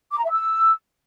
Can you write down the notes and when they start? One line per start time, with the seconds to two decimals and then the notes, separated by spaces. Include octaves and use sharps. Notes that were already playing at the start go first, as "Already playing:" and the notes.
0.11 D6
0.18 A#5
0.24 E5
0.31 E6